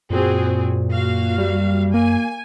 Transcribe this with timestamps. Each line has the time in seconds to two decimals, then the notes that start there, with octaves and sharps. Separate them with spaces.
0.10 F#2 A#2 C4 F#4 G#4
0.91 A#3 F#4 F5
1.38 G3
1.94 A#3 G#5